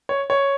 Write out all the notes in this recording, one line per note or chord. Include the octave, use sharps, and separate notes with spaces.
C#5
C#5